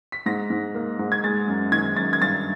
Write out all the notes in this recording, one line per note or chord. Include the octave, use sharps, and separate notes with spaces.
B6
G#2 A#6
G#2
A#3
G#2
G#6
G#3 A6
F#2
D#3 G#6
F#2 A6
G#6
G2 A6